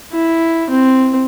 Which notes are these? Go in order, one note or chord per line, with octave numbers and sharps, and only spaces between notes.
E4
C4